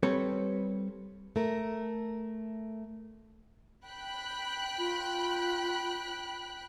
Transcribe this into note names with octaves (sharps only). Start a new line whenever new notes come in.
G3 C4 A4 B4 C#5
A3 A#4
G5 B5 F#6
F4